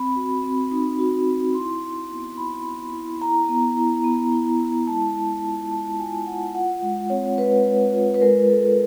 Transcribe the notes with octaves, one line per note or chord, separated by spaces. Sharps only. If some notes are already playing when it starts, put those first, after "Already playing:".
Already playing: C4 B5
F#4
C4
D#4
F#4
C4
E4 C6
E4
B3
E4 B5
B3
E4
E4 A#5
B3
E4
B3
E4
E4
G#3 A5
G#3
F4
G#3 A5
F4 G#5
F4 F#5
F4 F#5
G#3
C4 C#5
G#3 B4
G#3
F4
B4
G#3 A#4
G#3 A4